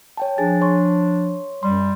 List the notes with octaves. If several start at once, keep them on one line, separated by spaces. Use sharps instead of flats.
C#5 G5 A5
F3 D4 G#4 G#5 A6
C#5 C6 C#6
F#2 G3 C6